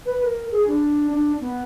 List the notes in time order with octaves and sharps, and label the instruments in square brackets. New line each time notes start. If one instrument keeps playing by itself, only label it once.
[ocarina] B4
A#4
G#4
D4
D4
B3